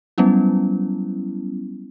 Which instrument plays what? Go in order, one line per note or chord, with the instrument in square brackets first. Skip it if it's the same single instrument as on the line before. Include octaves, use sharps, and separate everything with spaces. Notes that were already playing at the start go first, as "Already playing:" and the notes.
[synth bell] F#3 G3 B3 C#4 E4